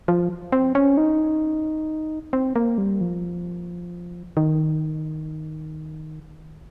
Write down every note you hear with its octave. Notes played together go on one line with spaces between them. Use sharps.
F3
C4
C#4
D#4
C4
A#3
G3
F3
D#3